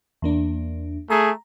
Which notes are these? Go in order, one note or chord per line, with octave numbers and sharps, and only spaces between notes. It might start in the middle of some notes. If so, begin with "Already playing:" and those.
E2 A#3 D4
A3 G#4 A#5